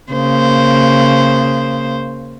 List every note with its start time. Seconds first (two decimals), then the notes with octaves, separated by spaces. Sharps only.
0.12 C#3 A#3 C5